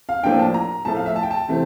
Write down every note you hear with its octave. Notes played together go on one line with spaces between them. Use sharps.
F5
A2 F3 A#3 D4 G5
A5
A#5
A2 F3 A3 A5
F5
E5
A5
G5
A5
C3 E3 A3 C4